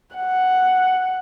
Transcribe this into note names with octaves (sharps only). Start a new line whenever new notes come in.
F#5